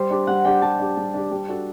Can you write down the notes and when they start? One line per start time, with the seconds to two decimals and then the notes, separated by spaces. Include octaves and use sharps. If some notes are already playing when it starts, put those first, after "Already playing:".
Already playing: G3 C5
0.10 D4 G4
0.27 G3 F#5
0.45 D4 G4 G5
0.62 G3 A5
0.79 D4 G4
0.97 G3
1.14 D4 G4
1.31 G3
1.49 D4 F#4 A4